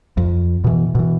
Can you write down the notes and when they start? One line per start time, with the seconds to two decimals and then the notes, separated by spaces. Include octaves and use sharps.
0.17 F2
0.64 B2 E3
0.95 B2 E3